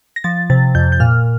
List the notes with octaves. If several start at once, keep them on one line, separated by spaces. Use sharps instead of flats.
A#6
F3 A6
C3 A6
F2 G6
G6
A#2 F6